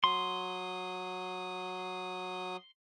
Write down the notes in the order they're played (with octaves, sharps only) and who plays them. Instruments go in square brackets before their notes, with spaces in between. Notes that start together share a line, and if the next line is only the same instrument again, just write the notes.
[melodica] F#3 D#6 [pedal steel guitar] C6